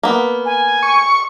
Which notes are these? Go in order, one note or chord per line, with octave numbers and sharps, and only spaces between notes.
A#3 B3
G#5
C#6